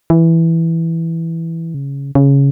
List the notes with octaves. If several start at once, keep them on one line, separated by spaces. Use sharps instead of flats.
E3
C#3
C#3